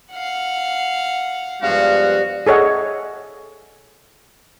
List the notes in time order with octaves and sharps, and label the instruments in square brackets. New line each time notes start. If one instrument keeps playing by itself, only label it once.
[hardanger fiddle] F5 F#5
[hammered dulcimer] G2 F3 [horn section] G#3 B3 F5 [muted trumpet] F#4
[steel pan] G#4 A4 C#5 D#5 F#5